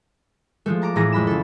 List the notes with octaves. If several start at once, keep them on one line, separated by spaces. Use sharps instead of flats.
F3 G#3 A3
A5 A#5 D6
A2 E3 A3 G#4 A#5 A#6
F2 G#3 B5 E7
C#3 A4